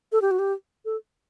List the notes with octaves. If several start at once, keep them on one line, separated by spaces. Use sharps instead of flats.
A4
G4
F#4
G4
A4